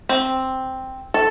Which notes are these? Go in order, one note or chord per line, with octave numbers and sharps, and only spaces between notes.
C4
A4